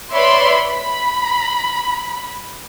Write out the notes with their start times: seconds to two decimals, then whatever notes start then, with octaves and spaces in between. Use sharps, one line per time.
0.13 B4 C#5 D5 E5 B5 C6
0.66 B5